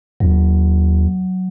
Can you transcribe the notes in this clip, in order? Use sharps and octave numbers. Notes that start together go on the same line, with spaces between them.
D#2 F#3